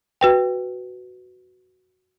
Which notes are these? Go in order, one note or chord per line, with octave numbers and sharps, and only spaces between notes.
F#4 B4 G5